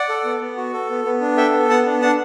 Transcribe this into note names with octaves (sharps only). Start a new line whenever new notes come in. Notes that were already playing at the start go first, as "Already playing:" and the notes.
Already playing: D5 F#5
A4
B3
B3
F#4
A4
B3
B3
D4
A4 E5 G5
B3
B3 F#5 A5
D4
D4 F#5 A5